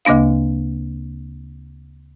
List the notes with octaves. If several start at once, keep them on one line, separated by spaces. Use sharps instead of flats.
D2 C#3 A#3 D4 F5